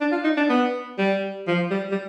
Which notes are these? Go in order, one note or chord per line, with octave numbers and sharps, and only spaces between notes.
D4
F4
D#4
D4
B3
G3
F3
G3
G3